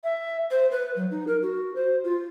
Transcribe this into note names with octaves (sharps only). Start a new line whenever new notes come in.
E5
C5
B4
F#3
D#4
A#4
F#4
C5
F4